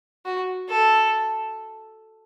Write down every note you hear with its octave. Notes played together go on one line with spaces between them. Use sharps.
F#4
A4